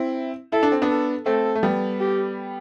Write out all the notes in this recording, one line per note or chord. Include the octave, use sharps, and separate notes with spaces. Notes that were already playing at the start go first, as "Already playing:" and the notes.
Already playing: C4 E4
E4 A4
D4
C4
B3 D4
A4
A3 C4 A4
A3
G3 B3
G4